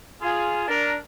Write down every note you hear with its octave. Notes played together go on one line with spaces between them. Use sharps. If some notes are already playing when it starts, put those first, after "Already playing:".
F4 G#4
D4 A#4